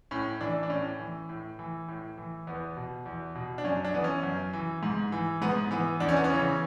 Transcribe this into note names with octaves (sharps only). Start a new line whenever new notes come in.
A2 C#4
E3 D4
D4
A2 C#4
E3
A2
E3
A2
E3
E2 B3
B2
E2
B2
D4
F#2 C#4
D4
E3 B3
C#4
F#2
E3
G#2
E3
G#2 B3
E3 B3
E2 D4
C#4
B3
C#4
C#3 E3